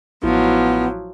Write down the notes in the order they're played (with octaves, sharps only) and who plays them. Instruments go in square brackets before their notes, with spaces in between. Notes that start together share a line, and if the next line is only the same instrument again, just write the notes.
[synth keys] A1 E4 [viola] F3 F#3 [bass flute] B3